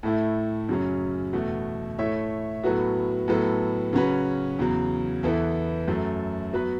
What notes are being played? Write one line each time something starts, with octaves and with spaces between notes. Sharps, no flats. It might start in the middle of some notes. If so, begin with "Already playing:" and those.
A2 A3 E4
F#2 C#3 F#3 C#4
E2 B2 A3 F#4
A2 A3 E4 C#5 E5
A2 F#3 B3 F#4 A4
A2 F#3 B3 A4
C#3 F#3 C#4 F#4 B4
E2 C#3 F#3
E2 E3 B3 E4 A4
F#2 F#3 A3
F#3 B3 F#4 B4